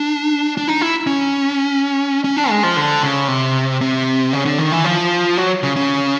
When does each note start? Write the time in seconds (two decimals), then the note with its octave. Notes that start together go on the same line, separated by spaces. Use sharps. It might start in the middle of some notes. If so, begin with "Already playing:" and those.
Already playing: D4
0.57 D4
0.68 D#4
0.81 E4
1.07 C#4
2.24 C#4
2.37 D4
2.50 G#3
2.63 F3
2.77 D3
3.03 C#3
3.28 C3
3.81 C3
4.33 C#3
4.45 D3
4.58 D#3
4.72 E3
4.84 F3
5.38 F#3
5.63 C#3
5.76 C#3